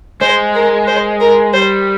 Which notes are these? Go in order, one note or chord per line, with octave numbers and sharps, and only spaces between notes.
G#3 C5
A#4
C5
A#4
G3 C5